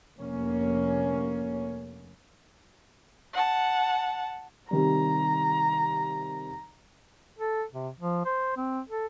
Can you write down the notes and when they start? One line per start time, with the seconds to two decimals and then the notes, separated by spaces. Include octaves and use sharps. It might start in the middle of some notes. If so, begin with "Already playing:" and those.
0.18 F1 A#3 C#4
3.33 F#5 A5
4.71 C3 D#3 G3 A#5
7.39 A4
7.72 C3
8.00 F3
8.26 C5
8.57 C4
8.89 A4